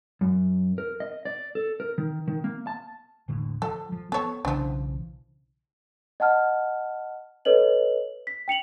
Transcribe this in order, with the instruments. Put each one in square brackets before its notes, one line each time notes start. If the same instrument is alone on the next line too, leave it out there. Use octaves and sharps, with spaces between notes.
[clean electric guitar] F#2
A#4
D#5
D5
A4
A#4
D#3
D#3
A#3
A5
[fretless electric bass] E1 A2 D3
[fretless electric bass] F3 [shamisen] A4
[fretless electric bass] F3
[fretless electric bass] B3 [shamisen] A4 C#5
[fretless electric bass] B1 C#3 E3 [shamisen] F3 D4
[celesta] D#5 F#5 A5 F6
A4 B4 C#5 D#5 F#7
B6
G5 C#7 F7 F#7